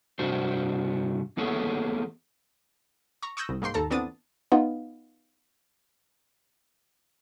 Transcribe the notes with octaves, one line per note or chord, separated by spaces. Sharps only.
G2 C3 D4 F#4 C5
E3 A#3 B3 G#4 A4 C#5
A#5 C#6
C#6 D#6 E6 F#6 G6 A#6
C2
G#2 A#3 G5 C6
D#2 A4 A5 A#5
E3 B3 C4 D4 D#6 A6
B3 D#4 F4